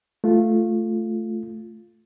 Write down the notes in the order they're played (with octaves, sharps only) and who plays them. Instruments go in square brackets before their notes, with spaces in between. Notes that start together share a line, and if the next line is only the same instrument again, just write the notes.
[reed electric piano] A3 F4